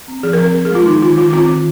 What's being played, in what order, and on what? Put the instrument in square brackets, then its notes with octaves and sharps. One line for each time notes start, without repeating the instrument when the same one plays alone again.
[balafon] C4
F3 G#4
A#4
C4
A#4
C4 A#4
G#4
G#3 F4
D#3 D#4
D#3 F4
D#3 F4
C4 F4
D#3